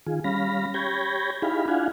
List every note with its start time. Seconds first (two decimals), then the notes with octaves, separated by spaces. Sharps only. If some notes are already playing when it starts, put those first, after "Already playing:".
0.06 D#3 F4 G#4
0.24 G3 C#4 F5 B5 A#6
0.74 G4 C#5 B5 G6 G#6 A#6
1.42 D#4 E4 G4 G#4 F5 B5
1.68 D4 E4 F4 F5 F#5 G#5